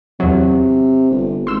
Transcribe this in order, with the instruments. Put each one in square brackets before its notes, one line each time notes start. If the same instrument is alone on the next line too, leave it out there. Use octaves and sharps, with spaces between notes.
[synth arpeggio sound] E2 F#3 [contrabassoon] C3
[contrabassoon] G1
[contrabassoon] G#1 [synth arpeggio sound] C6 E6